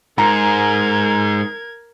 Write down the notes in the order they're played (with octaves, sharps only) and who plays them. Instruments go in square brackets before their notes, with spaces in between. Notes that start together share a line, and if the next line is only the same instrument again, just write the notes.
[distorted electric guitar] G#2 [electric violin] A#4 G#6 [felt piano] A#5